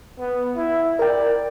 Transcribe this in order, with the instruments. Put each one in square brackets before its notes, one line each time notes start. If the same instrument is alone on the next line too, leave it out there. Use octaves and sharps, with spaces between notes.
[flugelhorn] B3
E4
[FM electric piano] A#4 G5 [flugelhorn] D5